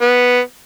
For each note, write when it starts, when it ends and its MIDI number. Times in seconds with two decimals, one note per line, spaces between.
0.01 0.39 59